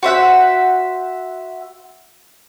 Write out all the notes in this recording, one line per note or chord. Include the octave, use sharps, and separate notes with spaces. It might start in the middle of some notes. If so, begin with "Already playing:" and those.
F#4 C5 E5 F#5